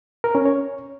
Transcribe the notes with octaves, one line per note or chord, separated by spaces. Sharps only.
A#4
C#4
C#5